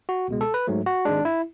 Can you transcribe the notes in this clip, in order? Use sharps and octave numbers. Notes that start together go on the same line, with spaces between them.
F#4
C#2 B2 G#3
A4
B4
G#2 F#3 A3
F#4
G#1 G#2 G#3 D4
E4